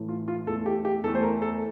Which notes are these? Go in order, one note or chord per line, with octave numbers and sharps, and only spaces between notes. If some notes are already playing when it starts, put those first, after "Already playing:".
Already playing: A2 E3 A3
F4
F4
E2 E3 A3 A4
G4
G4
E2 E3 A3 A4
C5
A#4
A4